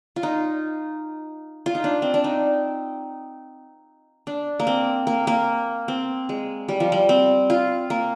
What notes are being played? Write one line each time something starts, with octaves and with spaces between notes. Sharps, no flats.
F4
D#4
F4
D#4
D4
C4
D4
D#4
D4
A#3
C4
A#3
A#3
C4
G#3
G3
F3
G3
C4
F4
A#3